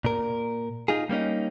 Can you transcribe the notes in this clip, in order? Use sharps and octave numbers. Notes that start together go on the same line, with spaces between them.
A#2 A#4
D#4 F4 G#4
G3 A#3 C#4 D#4